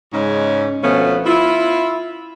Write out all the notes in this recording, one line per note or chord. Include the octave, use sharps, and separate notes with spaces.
G#2 C#3 G#3 C#4
D2 B2 F3 A3 B3 C#4
E4 F4